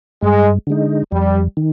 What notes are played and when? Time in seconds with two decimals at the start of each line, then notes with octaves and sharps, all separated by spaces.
0.23 G2 G#3
0.67 D3 G#3 D#4
1.12 F2 G3
1.57 D#3